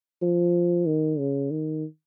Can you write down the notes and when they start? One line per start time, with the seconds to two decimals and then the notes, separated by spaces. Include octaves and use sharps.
0.22 F3
0.86 D#3
1.18 C#3
1.51 D#3